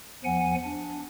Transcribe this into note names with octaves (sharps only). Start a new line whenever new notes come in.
E2 F3 F#5 G#5
D4